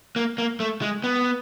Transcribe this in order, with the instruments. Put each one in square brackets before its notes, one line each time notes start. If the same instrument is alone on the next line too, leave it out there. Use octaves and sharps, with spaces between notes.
[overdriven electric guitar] A#3
A#3
A3
G#3
B3